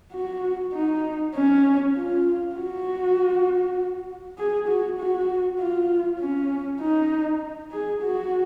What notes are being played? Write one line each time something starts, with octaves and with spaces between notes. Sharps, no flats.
F#4
D#4
C#4
F4
F#4
G#4
F#4
F#4
F4
C#4
D#4
G#4
F#4